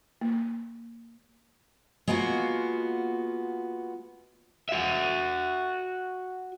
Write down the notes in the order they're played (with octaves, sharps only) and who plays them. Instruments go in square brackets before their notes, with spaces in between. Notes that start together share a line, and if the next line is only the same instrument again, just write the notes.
[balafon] A#3
[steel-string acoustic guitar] G#3 A#3 B3 F4 F#4
[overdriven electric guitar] F#4 E5